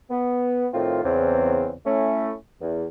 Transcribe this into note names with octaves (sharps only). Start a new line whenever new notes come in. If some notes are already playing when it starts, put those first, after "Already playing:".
B3
A2 D#3 C4 F4
E2 C#3 C4
A3 C#4 E4
E2